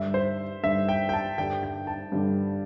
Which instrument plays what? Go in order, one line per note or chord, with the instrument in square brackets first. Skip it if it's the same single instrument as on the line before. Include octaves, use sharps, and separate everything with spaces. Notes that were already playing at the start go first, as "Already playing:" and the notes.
Already playing: [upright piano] G2 D3 G3 [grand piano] E5
[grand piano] C5
[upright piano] G2 D3 G3 [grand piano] E5
[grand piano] G5
G5
A5
[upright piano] G2 D3 G3 [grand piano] G5
[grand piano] G5
A5
[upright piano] G2 D3 G3